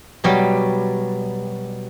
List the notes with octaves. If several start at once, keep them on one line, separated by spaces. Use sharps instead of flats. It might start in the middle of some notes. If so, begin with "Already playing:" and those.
B2 F#3 G3